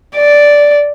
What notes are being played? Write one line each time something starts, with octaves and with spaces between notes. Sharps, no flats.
D5